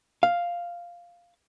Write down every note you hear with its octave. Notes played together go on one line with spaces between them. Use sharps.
F5